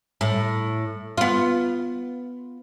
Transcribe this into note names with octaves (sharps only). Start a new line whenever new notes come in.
A2
B3 F4